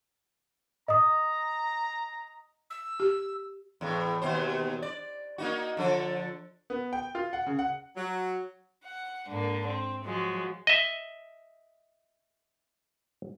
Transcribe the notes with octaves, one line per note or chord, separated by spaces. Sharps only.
D#5 A#5 D#6
E6
G4
E2 A2
D#2 B2 C5
D5
A#3 D#4 F#4
D3 F3 A4
B3
G5
F4
F#5
C#3
F#5
F#3
F#5
G#2 D3 A#3
C4
F3 F#3 G#3
D#5 E5